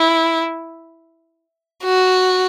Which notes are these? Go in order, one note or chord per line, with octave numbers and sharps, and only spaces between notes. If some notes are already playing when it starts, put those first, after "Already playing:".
Already playing: E4
F#4